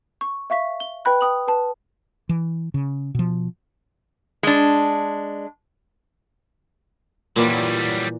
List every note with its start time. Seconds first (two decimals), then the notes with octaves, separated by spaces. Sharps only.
0.21 C#6
0.50 E5 F5 C#6 B6
0.80 G7
1.05 B4 G5 B5 F#6
1.21 G5 D#6 F#7
1.48 B4 A5
2.29 E3
2.74 C#3
3.15 B2 F3
4.43 G#3 D4
7.36 A#2 E3 F#3 G3 D5